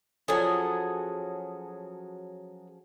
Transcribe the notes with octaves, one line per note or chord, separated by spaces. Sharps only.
F3 F#3 C#4 G#4 A4